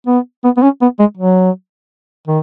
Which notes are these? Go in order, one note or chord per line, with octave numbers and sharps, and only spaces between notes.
B3
B3
B3
C#4
B3
G#3
F#3
D#3